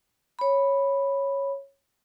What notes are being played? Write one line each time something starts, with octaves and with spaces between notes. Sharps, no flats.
C#5 B5